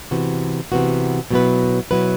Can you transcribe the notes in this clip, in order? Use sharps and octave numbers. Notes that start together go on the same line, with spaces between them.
C3 E3 B3 F#4
C3 E3 B3 F#4
B2 F#3 B3 E4 B4
B2 F#3 B3 E4 B4